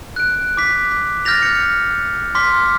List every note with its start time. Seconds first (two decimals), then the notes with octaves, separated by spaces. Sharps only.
0.16 F#6 D7
0.57 D6 B6
1.25 F6 G6 A6 A#6 F7
1.42 C#7
2.35 C6 D6 F6 B6